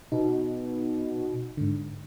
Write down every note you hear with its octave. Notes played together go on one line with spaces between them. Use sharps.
B2 D#4
G#2 D3